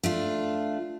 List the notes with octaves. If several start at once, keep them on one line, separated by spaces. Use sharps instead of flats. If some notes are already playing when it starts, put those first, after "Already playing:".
A3 D4 F4